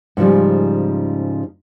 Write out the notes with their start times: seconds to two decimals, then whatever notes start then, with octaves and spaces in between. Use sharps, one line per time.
0.17 G#2 C#3 F3 G3